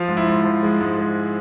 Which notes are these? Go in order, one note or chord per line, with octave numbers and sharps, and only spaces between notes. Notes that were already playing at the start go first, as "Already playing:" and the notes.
Already playing: F3 F4
G#2
E4
G#2
F3
G#3
G#2
G#3